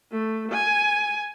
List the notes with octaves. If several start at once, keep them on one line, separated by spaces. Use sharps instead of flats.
A3
G#5